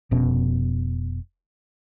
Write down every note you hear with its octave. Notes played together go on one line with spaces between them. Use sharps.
F1 B2 C#4